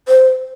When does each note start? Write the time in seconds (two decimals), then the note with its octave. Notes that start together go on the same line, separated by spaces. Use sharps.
0.08 C5